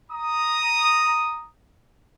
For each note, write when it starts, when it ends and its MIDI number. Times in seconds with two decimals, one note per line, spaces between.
0.11 1.46 82
0.11 1.46 87